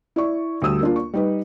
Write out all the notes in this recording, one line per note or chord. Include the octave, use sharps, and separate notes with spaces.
E4 D5 C#6
D2 G3 D#6 E6
A#3 D4 F4
C#6
G3 D#4 B4